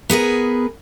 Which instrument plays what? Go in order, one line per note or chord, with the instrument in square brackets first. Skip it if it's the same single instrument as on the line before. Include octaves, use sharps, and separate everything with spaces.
[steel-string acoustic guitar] B3 G#4 A#4 B4